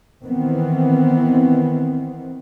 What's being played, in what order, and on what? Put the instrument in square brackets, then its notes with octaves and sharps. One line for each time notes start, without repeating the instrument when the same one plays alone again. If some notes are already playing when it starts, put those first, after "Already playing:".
[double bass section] D#3 E3 B3 C4